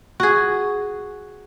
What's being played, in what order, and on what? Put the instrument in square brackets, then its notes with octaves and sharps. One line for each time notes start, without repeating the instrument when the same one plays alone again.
[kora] F#4 G#4